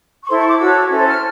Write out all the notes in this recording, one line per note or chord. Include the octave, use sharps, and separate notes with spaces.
C#6
E4 A4 C5 C6
C#6
D6
F#4 A4 C#5 E6
C#4 E4 A4 C5
F6